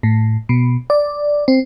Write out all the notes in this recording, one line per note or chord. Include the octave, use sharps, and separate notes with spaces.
A2
B2
D5
C4